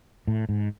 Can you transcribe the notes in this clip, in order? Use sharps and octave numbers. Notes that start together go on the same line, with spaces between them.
A2
G#2